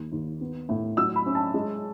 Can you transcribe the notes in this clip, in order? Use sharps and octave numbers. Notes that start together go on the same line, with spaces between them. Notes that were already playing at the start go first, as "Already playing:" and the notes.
Already playing: D#2
D#2
B3
A2
F#3 E6
B5
C#4
A5
G#3